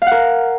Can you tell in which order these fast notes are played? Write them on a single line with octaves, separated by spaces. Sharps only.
F5 F#5 A#4